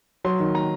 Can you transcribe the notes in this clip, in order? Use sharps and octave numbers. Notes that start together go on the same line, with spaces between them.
F#3 C6
D#3
A#5